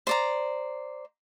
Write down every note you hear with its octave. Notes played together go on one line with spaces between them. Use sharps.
C5 D5 A#5